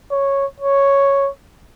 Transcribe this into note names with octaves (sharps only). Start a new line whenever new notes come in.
C#5
C#5